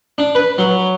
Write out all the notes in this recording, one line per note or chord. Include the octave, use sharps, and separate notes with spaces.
D4
B4
F#3